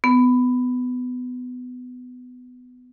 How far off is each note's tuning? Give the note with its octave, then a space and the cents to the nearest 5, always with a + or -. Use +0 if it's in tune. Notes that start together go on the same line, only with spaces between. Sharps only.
B3 +20